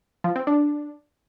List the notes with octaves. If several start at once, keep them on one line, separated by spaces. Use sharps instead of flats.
F3
C4
D4